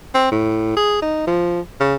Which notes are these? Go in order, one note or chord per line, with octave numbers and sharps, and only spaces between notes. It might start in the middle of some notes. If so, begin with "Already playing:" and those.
C4
A2
G#4
D#4
F3
C#3